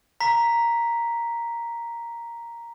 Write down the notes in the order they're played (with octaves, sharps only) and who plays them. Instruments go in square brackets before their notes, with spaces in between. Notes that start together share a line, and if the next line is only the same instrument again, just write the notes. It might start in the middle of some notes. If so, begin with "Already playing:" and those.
[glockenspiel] A#5 B6